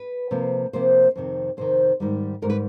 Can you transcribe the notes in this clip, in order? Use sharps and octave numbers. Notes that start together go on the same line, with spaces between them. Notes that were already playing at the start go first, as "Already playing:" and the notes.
Already playing: B4
C3 F3 A#3
C3 F3 A#3 C5
F2 C3 D#3
F2 C3 D#3 C5
G#2 D#3 G3
G#2 D#3 G3 A#4
B4